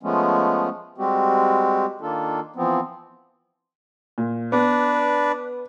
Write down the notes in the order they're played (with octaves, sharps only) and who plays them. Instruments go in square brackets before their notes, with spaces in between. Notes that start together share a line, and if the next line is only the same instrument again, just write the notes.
[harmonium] F3 G#3 A3 B3 C#4
G3 G#3 C4 F#4 G4
D#3 A#3 D4 F4 A4
E3 F3 B3 C4
[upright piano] A#2
[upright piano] B3 [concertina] D4 B4 D5